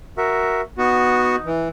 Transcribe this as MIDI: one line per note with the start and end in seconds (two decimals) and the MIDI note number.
0.17 0.61 66
0.17 0.61 70
0.17 0.61 76
0.78 1.36 59
0.78 1.48 63
0.78 1.36 66
1.46 1.69 52